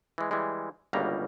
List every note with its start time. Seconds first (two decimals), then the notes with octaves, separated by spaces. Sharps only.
0.18 E3 G#3
0.31 E3 G3 G#3
0.93 G1 C#2 B2 G3 A#3 A#5